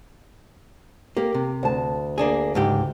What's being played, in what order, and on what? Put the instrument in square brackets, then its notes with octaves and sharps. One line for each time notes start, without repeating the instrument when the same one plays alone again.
[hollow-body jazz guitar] A#3 [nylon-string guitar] G4 A#4
[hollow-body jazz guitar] C3
[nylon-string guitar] D2 A5
[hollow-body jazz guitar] A#3 D4 G#4
C#2 G#2 G4